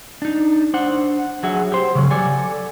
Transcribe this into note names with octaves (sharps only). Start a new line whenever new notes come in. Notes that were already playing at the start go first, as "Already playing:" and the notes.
D4 D#4
D4 C5 F#5
F#3 G#4 E5 F#5
G4 C5
C#3 F#3
G4 A4 D5 F#5 G#5